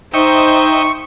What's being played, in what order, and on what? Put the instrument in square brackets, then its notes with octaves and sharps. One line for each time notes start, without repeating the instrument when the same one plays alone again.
[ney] D#4 [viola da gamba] C5 [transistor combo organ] D#5 E5 G5 [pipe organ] C#6